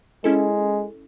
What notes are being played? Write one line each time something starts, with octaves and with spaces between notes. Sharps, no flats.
G#3 C#4 E4 A4